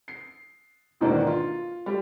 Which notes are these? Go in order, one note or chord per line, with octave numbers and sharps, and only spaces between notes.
C7
E2 G#2 B2 D#3 A#3 D4
F4
G3